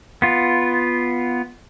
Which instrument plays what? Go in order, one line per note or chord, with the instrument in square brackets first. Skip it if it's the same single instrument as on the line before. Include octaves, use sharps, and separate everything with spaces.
[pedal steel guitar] B3 F4